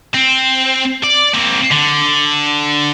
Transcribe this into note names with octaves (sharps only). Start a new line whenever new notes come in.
C4
D5
A#3 C4
D3